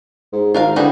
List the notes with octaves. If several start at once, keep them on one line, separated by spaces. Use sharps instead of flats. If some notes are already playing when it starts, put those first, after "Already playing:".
G#2
G#1 F4 A#4 F5
D3 E3 G3 D#4